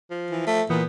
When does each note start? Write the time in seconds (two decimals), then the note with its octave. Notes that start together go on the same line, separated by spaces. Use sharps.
0.10 F3
0.31 E3
0.47 A3
0.70 A#2 E3 B3